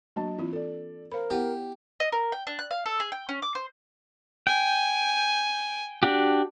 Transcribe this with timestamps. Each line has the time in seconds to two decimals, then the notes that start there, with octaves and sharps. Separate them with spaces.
0.16 F#3 A#3 D4 D#5 A5
0.38 E3 C4 E4 F4
0.53 A4 D5
1.12 A#4 C5 F5 B5
1.30 B3 E4 G4 F#5
2.00 D#5
2.12 A#4
2.32 G5
2.47 D4
2.59 F#6
2.71 F5
2.86 A4
3.00 G#4
3.12 G5
3.29 C#4
3.42 D6
3.55 C5
4.47 G5 G#5
6.03 D4 F#4 G4